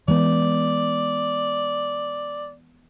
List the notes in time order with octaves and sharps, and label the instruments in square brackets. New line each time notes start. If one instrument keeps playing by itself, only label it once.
[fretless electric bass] E3 G#3 B3 [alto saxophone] D5